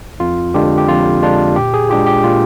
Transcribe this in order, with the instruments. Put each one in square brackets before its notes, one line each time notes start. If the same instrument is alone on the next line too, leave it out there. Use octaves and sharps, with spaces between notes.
[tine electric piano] F2 F4
D3 G#3 D4 F4 G4
G4
F2 F4
D3 G#3 D4 F4
A#2 G4
G#4
G#3 D4 F4 G4
G4
A#2 F4